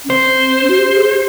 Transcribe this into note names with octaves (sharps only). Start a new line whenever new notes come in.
C#4
C4 C5
C#4
F#4
G4
G#4
G4